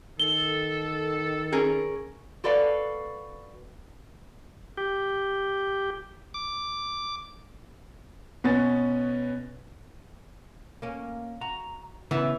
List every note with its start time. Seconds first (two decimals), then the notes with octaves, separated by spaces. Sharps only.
0.20 D#3 A4 G7
1.52 C#4 G#4 A#4
2.44 F#4 A4 B4 D5 F5
4.77 G4
6.34 D6
8.44 B2 B3 C#4 B4 G#5 A6
10.82 A#3 C#4
11.41 F#4 A#5
12.11 C#3 E3 B3 E4